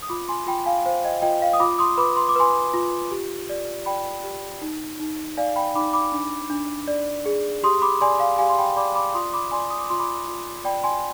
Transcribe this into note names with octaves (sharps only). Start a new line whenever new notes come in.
D#6
F4 B5 D6
G#5 C6
F4 G5 B5
F5 G#5
C5 F5
D#5 G5
F4 D#5 G5
F5
D#6
F4 B5 D6
C6 D#6
B4 B5 D6
C6
D6
B4 G#5 C6
F4
G4
D5
D5 G5 B5
G4
D#4
D#4
D5 F5 G#5
G5 B5
D#4 B5 D6
B5 D6
D4
D4
D5
G#4
G4 C6 D#6
B5 D6
D5 G#5 C6
F5
G4 F5 G#5
C6
G5 B5
D5 B5 D6
B5 D6
F4 C6 D#6
B5 D6
D5 G#5 C6
D#6
D6
F4 C6
B5 D6
F4
D5 G5 B5
G#5 C6